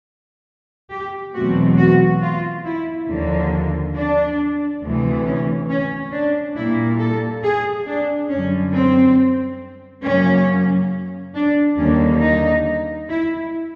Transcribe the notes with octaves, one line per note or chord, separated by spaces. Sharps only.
G4
E2 B2 F#3 A3 C4 F#4
F#4
F4
E4
D#2 D3 F3 A#3
D4
D2 C3 E3 A3
C#4
C#4
D4
A#2 G3 A#3 E4
A4
G#4
D4
F#2 D3 G3 C#4
C4
F#2 C#3 F#3 A#3 C#4
D4
D#2 D3 G3 A#3 C#4
D#4
E4